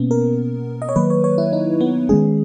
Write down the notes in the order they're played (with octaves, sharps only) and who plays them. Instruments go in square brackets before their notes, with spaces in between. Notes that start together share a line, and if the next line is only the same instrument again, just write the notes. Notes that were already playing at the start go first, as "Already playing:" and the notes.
Already playing: [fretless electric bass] B2 A#3 C#4 [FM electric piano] B3
[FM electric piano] A#4
D#5
C#5
[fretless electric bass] D#3 F#3 A#3 [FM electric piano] B4
[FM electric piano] C#5
C#5
E4
D#4
B3
[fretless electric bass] D#3 G#3 C#4 [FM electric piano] G#4